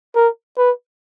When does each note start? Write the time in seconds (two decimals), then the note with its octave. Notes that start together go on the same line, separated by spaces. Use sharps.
0.16 A#4
0.58 B4